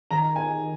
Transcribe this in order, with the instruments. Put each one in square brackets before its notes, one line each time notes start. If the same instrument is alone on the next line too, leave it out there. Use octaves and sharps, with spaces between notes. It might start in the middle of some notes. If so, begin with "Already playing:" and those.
[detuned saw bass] D#3 [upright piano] A#5
[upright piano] G#5